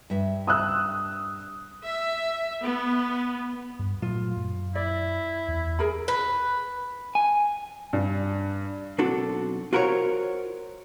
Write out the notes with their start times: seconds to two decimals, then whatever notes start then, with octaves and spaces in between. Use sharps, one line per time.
0.10 G2 E5
0.47 D#6 E6 F#6
1.84 E5
2.64 B3
3.79 G2
4.02 A#2 F#3 A3 F4
4.37 F#2
4.75 E4 D5
5.48 E2
5.79 G#4 A#4 B5
6.08 B4
7.15 G#5
7.93 G2
8.98 B1 C4 D4 F#4 A4
9.73 F4 F#4 A#4 C5 C#5